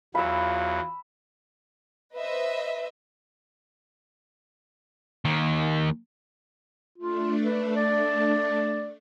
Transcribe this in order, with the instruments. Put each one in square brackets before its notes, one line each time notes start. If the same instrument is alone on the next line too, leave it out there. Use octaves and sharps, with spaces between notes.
[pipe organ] E2 F#3 [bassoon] F4 [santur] B5 E6
[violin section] B4 C5 D#5 E5
[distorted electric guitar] D#2 D#3
[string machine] A3 D4 [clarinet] F4
[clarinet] B4
D5